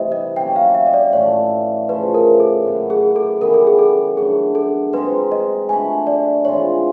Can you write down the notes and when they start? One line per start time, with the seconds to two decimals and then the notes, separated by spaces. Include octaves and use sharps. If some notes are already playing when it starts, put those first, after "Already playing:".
Already playing: C3 E3 G3 A3 D#5 E5
0.12 D#5
0.36 F#3 A#3 C#4 G5
0.56 F5
0.74 E5
0.87 D#5
0.94 D5
1.13 A2 E3 A3 C#5
1.89 C#3 F3 A3 B4
2.14 A#4
2.40 A4
2.64 A2 F#3 B3 E4
2.90 G#4
3.16 A4
3.41 C#3 E3 G3 B3 A#4
3.54 A4
3.67 G#4
3.79 A4
4.17 F#3 A3 D4 G#4
4.55 A4
4.93 G#3 C4 D#4 G4 B4
5.32 D#5
5.69 A3 D4 F#4 B4 G#5
6.07 D5
6.45 E3 G#3 C4 F4 C#5